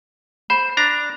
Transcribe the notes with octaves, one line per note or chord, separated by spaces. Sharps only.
C5 B5
D4 A#5